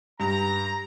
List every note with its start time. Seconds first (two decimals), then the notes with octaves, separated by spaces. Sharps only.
0.20 G2 G3 A#5